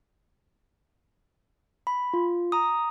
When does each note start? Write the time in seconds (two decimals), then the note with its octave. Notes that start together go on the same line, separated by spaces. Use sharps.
1.87 B5
2.13 F4
2.52 A#5 D#6